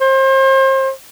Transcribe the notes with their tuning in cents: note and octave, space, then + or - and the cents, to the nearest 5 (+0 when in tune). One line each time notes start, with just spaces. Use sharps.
C5 +35